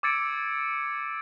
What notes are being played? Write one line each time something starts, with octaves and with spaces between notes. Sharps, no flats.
D6 E6 G#6 A6 C#7 D7